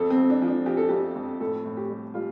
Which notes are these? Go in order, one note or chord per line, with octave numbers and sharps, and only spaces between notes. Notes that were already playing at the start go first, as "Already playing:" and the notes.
Already playing: F2 A4
C4
F2
D4
F3
D4
F3 G4
A4
F2 G4
F2
A2 A4
A2
G4
G3
G3 F4